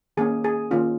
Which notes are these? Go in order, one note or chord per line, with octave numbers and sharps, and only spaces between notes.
D#3 A#3 C#4 G#4
G#4
D#3 A#3 C#4 F4